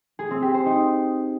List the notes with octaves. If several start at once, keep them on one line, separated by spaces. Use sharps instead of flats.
G#4
C4
G4
C5
D#4